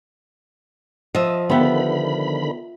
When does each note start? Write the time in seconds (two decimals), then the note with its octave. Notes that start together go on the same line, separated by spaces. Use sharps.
1.15 F3 D#5 E5
1.50 D3 D#3 B3 F4 G4 E5 F#5 B5